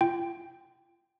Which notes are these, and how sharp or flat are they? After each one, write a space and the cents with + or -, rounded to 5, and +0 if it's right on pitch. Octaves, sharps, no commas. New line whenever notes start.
F4 -35 G5 +0 C6 -30